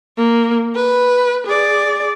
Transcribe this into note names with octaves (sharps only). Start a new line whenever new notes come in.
A#3
B4
G#4 D5